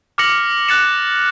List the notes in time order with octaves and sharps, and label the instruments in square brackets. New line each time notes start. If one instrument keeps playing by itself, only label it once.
[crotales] D6 F6 A#6 C#7 F#7
F#6 A6 C#7 E7